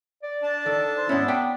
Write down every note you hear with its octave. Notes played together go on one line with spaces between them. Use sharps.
D5
D4 A5
D#3 A4
C5
G#2 B3 C#4 E4
D4 G5 B5